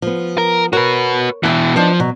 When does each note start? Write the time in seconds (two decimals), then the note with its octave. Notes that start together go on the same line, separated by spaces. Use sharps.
0.02 F3 B3
0.38 A#4
0.73 F#4 A#4 B4 C#5
1.43 B2 E3 F#5 G5
1.76 F3 B3 D4 D#4
2.00 B2 F#3